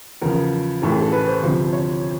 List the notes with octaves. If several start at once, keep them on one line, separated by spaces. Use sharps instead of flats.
E2 C#3 F3 A#4
A1 A2 E3 A#4
G#4
A4
B4
C5
D2 C3 F3
C#5